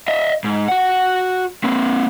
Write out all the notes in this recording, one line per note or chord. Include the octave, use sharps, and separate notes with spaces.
D#5 E5
G#2
F#4 F#5
A#3 C4